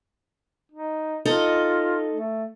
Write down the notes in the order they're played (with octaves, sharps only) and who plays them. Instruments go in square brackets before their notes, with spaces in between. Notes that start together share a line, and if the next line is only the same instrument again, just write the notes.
[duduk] D#4
[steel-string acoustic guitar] D#4 A4 D#5 [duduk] F4
[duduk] A3